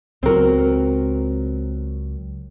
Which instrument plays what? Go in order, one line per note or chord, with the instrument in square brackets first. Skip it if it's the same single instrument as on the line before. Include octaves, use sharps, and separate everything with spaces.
[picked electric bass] C#2 F#3 [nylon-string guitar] C4 A#4